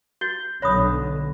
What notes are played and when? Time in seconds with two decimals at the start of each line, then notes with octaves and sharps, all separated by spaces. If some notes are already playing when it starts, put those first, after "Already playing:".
0.21 F#4 G6 A6 G7
0.62 B1 D3 C#5 B5 D#6 F#6 A#6